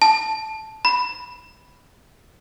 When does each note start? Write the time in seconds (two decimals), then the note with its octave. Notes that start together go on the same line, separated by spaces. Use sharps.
0.02 A5
0.85 B5